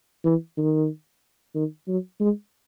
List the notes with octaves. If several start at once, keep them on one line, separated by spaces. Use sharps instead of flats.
E3
D#3
D#3
F#3
G#3